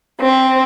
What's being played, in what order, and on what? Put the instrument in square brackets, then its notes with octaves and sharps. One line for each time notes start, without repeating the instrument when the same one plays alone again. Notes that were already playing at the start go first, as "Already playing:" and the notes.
[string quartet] C4